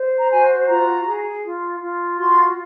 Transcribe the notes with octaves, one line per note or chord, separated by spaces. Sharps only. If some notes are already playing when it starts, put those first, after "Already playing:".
Already playing: C5
A#5
F#4 G#5
F4 A#5
G#4
F4
F4
F#4 C6